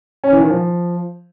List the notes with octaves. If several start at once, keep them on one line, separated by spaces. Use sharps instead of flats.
C#4
E3
D#3
F3